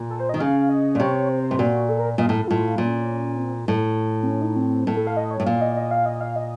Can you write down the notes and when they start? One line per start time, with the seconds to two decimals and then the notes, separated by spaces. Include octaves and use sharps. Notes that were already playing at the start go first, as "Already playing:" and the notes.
Already playing: A#2
0.10 A4
0.20 C5
0.29 D#3 D#5
0.40 C#3 F5
0.69 D#5
0.95 A#2
0.99 C3 C#5
1.29 C5
1.44 C5
1.51 A2
1.59 A#2 F#4
1.89 A4
1.99 A#4
2.18 A#2 D#5
2.29 A2 A#4
2.39 A4
2.48 A2 F4
2.78 A#2 C#4
3.38 C4
3.68 A2
4.23 C4
4.27 C#4
4.42 D#4
4.56 C4
4.87 A2 A#3
4.97 A4
5.07 F5
5.17 D#5
5.31 C#5
5.40 A2
5.46 A#2 F5
5.61 D#5
5.76 D#5
5.91 F5
6.06 D#5
6.21 F5
6.36 D#5